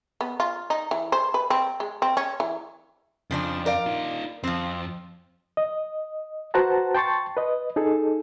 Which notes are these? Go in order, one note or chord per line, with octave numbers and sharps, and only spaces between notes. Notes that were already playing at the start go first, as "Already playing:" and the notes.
B3
F4
D#4
E3
C5
B4
C4
G#3
C4
C#4
E3
F2 C#3 F3 D4
A#4 D5 F5
D#4 F4
F2 F3 C4
D#5
F#4 B4 C5 F#5 A5 A#5
G5 A5 C6 C#6 A6
B4 D#5
D#4 G#4 A4